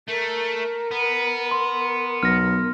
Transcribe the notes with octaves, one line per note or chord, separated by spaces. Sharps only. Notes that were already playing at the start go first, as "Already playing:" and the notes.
A3 A#4
B3
C6
B1 F6 A#6